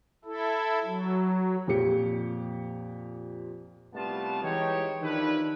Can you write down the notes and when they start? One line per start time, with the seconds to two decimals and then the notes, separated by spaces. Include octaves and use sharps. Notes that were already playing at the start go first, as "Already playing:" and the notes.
0.25 E4 A4
0.84 F#3
1.67 F2 A#2 F3 G4 C#7
3.94 C2 G3 A3 B3 F4 A5
4.43 E3 G#3 D#4 G4 C#5
5.02 D#3 F3 G3 D4 E4 B4